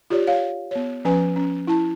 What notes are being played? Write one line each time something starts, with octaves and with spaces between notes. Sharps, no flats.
F4 G4 C#5 D5
C#5 F5
B3 C#5
F3 C#4 B4 G#5
C#4
E4 A5